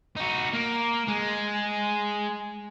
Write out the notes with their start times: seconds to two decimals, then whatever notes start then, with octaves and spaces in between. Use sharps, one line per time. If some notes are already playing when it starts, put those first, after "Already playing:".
0.16 D#4 F#4
0.53 A#3
1.08 G#3